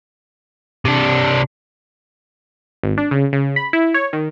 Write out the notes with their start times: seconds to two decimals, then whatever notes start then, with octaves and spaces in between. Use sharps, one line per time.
0.85 C3 D4
2.83 G#1
2.98 D4
3.11 C#3
3.33 C#3
3.56 B5
3.73 E4
3.94 C#5
4.13 D#3